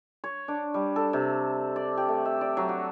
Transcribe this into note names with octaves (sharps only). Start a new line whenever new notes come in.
C#5
D4
G3
A4
C3
D5
G4
A3
E5
D5
F#3
F#4